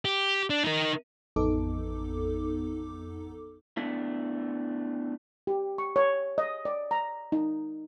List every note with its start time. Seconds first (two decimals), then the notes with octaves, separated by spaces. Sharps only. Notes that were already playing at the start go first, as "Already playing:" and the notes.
0.05 G4
0.50 D4
0.65 D#4 A#4
1.36 A1 F2 B3 D#4 A4 D6
3.77 A3 B3 D4 E4
5.47 G4
5.78 C#6
5.96 C#5
6.38 D#5
6.65 D5
6.91 A#5
7.32 D#4